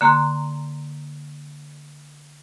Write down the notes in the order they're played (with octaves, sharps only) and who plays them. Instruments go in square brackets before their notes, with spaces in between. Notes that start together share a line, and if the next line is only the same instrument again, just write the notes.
[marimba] D3 A#3 A#5 C6